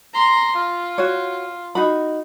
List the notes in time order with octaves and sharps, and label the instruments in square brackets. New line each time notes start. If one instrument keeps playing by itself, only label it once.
[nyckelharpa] A#5 C6
F4
[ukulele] F#4 C#5
D#4 F#4 B5